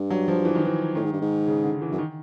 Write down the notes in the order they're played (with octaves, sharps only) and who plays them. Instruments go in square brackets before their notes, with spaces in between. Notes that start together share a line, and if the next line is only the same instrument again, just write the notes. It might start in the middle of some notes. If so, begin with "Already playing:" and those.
Already playing: [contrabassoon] G2
[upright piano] F#3
F3
E3
D#3
E3
[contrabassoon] A2 [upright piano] D#3
[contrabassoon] G#2
G2
G#2
[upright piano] C#3
D3
E3
[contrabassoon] F#2
[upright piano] D#3